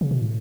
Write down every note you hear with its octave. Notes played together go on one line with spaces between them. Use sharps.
C#3
B2
A2